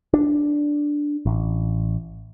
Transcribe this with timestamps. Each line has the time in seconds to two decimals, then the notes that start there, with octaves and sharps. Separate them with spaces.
0.13 D4
1.26 A1